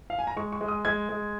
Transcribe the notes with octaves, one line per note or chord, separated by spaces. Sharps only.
F5
G#5
A#5
G#3 C#6
C#6
G#3
D#6
G#3 G#6
G#3